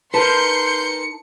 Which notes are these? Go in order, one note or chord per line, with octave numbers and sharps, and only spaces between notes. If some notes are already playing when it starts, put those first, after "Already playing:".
D#4 A#4 B4 A5 C6 G6 C#7